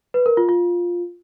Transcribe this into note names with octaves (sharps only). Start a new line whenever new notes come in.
B4
A#4
F4
F4